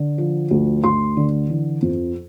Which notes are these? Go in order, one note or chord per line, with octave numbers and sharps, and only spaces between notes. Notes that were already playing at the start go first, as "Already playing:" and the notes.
Already playing: D3
F3
D2
D2 C6
D3
E3
F2